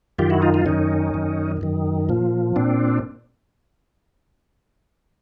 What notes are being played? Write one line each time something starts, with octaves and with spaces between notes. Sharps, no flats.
F#2 D#3 F4 G4
E4 F#4
D#4 F4
D#4 F4
F#2 D#3 C#4 D#4
F#2 D#3
F#2 D#3
A#2 F3
A#2 C4 D4